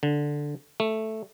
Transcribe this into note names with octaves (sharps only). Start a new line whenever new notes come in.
D3
A3